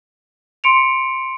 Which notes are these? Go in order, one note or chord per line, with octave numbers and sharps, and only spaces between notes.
C6 C#7 D7 F7